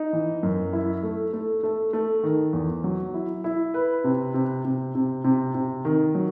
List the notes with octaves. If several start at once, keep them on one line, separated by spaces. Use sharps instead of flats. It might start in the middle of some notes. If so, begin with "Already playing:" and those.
Already playing: D#4
E3
F#2
E4
A3
A3
A3
A3
D#3
E2
F#3
E4
E4
B4
C3
C3
C3
C3
C3
C3
D#3
F#3